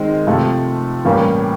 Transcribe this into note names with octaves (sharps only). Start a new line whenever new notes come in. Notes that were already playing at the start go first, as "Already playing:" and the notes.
Already playing: D#3 G#3 C4
C3 F3 A3
A2 E3 G3 A#3 C#4